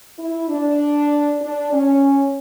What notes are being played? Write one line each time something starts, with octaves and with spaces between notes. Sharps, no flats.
E4
D4
D4
C#4